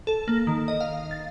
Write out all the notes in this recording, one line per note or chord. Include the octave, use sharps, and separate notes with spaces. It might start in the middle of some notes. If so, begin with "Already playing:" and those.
A4
A#3
D#3
D#5
F5
A6